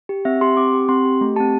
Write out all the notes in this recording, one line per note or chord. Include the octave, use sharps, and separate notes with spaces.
G4
C4 E5
G4 C6
C4 D6
G4
C4 C6
G4
A3
C4 G4 A5